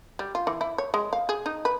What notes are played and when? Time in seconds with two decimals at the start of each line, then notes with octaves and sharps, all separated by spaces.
0.19 G3
0.35 F4
0.47 E3
0.61 E4
0.78 C#5
0.94 G#3
1.13 F5
1.29 G#4
1.46 D#4
1.65 B4